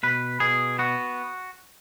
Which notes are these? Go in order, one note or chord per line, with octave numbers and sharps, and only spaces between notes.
B2 B4
B2 G#4
B3 F#4